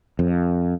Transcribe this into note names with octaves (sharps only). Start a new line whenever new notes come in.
F2